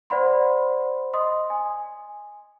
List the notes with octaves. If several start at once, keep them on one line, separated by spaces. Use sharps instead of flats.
C5 D5 F#5 B5 C6
D#5 C6 D#6
G#5